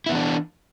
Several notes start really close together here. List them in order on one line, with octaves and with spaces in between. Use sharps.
E4 B3 E3 D4